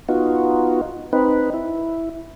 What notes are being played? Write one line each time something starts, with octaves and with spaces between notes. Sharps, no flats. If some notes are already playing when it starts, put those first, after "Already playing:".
B3 D#4 F4 F#4
C4 D#4 B4
E4